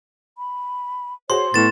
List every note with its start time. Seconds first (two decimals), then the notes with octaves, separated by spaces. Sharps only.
0.38 B5
1.30 F#4 G#4 C5 C#5 C6
1.54 A2 B3 C#6 A6 E7